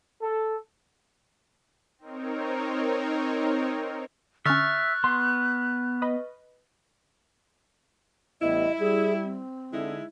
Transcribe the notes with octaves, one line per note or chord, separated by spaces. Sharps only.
A4
C4 D#4 A#4 C#5
D3 C#4 E5 C#6 F6 F#6 A6
B3 C6
B4 D#5
A1 G3 B3 E4 D#5
G3 G#4
C4
D3 G#3 D#4 E4